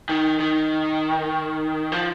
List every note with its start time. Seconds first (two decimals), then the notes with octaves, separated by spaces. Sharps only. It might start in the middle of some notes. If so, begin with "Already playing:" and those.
0.09 D#3
0.40 D#3
1.92 F3